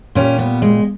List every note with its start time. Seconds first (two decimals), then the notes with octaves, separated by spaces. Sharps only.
0.15 A#2 G3 C#4
0.39 B3
0.62 G#3